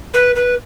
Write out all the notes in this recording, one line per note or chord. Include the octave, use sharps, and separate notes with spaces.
B4
B4